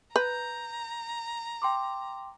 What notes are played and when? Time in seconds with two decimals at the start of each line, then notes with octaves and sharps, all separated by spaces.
0.16 B4 A#5 G6
1.62 G5 C6 D6